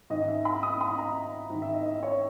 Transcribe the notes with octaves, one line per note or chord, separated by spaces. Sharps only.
G#2 D#3 D#5
E5
B5
D#6
B5
A#5
G#2 D#3
E5
D#5
D#5
C#5